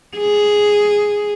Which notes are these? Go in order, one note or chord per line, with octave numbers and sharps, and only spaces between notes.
G#4